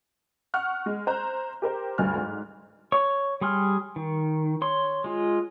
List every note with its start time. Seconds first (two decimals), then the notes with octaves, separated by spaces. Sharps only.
0.54 F#5 C#6 F6 F#6
0.86 G#3
1.07 C5 A#5 F#6
1.62 G4 A#4 C5
1.98 D2 G2 G#5 F6
2.16 G#2
2.92 C#5 C#6
3.41 G3 G#4 C6 F6
3.96 D#3
4.62 C#5 C6
5.04 G#3 F4